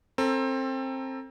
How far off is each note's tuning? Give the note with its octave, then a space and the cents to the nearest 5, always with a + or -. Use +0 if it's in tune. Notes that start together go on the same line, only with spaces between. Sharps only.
C4 +20 A4 +20 A#5 +20